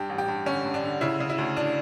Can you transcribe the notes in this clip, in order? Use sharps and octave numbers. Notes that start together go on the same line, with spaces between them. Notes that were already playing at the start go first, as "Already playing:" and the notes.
Already playing: G2 G4
A1
G4
G2
D3 C#4
G2
D4
D3
C#3 E4
C#3
E4
D2
D4